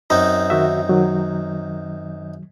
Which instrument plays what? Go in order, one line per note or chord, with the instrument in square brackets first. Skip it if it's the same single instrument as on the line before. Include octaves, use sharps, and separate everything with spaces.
[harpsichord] F#2 C4 D#4
[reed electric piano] D#3 F#4 E5
D#3 F#3